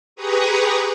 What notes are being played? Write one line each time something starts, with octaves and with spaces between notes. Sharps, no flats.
G4 G#4 B4 A#5 C#6 D#6